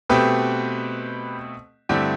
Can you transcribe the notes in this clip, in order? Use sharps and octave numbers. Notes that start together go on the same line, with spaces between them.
B2 A3 C4 G4 B4
G2 D3 A3 C4 E4 G4